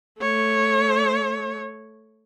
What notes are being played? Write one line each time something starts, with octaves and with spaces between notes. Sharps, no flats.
A3 C#5